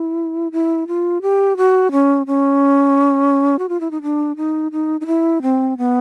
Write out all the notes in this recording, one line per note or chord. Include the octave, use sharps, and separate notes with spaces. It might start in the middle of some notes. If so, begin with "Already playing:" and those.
Already playing: E4
E4
F4
G4
F#4
C#4
C#4
F#4
F4
E4
D#4
D4
D#4
D#4
D#4
E4
C4
B3